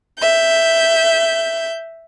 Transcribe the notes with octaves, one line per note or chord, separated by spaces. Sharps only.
E5 G6